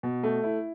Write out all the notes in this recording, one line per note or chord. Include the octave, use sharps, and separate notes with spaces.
B2
A3
E4